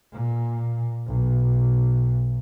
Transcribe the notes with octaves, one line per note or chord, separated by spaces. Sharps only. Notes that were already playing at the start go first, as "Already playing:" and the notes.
A#2
B1